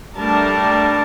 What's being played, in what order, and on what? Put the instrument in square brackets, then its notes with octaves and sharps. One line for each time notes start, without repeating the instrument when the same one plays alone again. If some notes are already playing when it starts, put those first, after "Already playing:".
[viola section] G3 A3 D4 A#4 A5